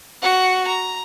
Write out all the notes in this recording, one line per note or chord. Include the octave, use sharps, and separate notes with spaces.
F#4 F#5
A#5